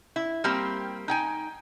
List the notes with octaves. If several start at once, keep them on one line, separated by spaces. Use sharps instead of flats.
E4
G3 A#3 C4 G4
D#4 G5 G#5